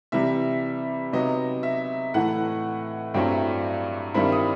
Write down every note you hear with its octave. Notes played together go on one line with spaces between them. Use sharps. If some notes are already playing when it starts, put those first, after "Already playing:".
C3 E3 G3 E5
C3 F#3 B3 D#4 D#5
E5
A2 E3 A3 F#5
G2 F#3 A3 C4 E4 G5
G2 D#3 G3 C4 E4 B5
D#6